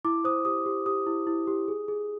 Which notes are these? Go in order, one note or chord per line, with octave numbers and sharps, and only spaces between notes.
E4 D6
C5 D#6
G4 D#6
G4
G4 D#6
E4
E4
G4
G#4
G#4